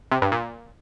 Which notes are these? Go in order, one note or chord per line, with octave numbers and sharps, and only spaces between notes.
C3
G2
A#2